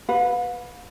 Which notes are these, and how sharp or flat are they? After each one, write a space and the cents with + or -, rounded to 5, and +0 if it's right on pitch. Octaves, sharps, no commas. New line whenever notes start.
B4 +0 F5 +45